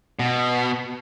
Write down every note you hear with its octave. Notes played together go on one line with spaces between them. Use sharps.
B2